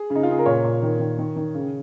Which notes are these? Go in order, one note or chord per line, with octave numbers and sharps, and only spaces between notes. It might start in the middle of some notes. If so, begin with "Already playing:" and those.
Already playing: G#4
C#3
D#4
F4
C#3 G#4
A#4
A#2 C#5
A#2
D#3
D#3
D#3
D#3
C#3